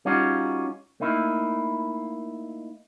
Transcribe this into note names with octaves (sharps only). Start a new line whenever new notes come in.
G3 C#4 D#4 F4 F#4
A3 A#3 D#4 E4